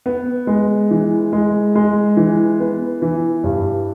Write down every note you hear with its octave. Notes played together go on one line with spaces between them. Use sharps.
B3
G#3
E3
G#3
G#3
E3
B3
E3
G2